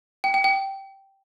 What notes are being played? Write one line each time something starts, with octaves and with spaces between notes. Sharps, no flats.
G5
G5
G5